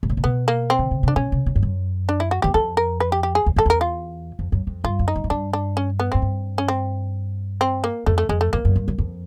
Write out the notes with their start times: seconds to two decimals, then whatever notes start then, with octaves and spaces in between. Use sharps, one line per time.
0.03 G#2
0.10 A2
0.17 A#2
0.24 B2 B3
0.48 A#3
0.70 C4
0.79 D3
0.91 C#3
1.03 C3 D4
1.16 B2 C#4
1.32 C3
1.46 B2
1.56 G2
1.63 F#2
2.09 D4
2.20 E4
2.31 F#4
2.42 E2 G4
2.54 F2 A4
2.77 A#4
3.00 B4
3.12 G4
3.23 G4
3.35 G#4
3.46 E2
3.56 F2 A4
3.66 E2 A#4
3.81 F4
4.39 F2
4.52 F#2
4.67 F2
4.84 G2 F4
4.99 F#2
5.08 D#4
5.16 G2
5.24 G#2
5.30 G2 D4
5.53 D4
5.77 C#4
6.00 B3
6.12 G#2 C4
6.22 G2
6.58 C#4
6.68 C4
7.61 C4
7.84 A#3
8.06 F2 A3
8.18 A3
8.29 F2 G#3
8.41 A3
8.53 F2 A#3
8.65 F#2
8.76 G2
8.88 F#2
8.98 F2